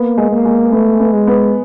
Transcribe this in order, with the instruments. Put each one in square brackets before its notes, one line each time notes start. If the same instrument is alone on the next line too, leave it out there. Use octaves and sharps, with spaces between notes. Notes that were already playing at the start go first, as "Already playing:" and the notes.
Already playing: [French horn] A#3 [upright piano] B3
[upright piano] G#3
[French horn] A#3
[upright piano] G#3
[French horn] A3 [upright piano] B3
[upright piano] B3
[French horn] G#3
[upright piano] B3